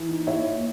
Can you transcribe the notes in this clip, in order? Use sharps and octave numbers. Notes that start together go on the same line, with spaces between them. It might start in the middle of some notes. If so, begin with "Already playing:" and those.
Already playing: E3
D#4
E4 C#5 E5
A#2